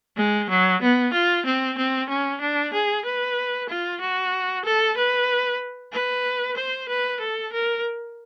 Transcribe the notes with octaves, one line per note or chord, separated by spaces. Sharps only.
G#3
F#3
B3
F4
C4
C4
C#4
D4
G#4
B4
F4
F#4
A4
B4
B4
C5
B4
A4
A#4